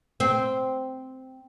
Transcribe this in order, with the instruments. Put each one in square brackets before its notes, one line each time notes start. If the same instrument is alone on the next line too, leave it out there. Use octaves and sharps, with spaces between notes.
[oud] C4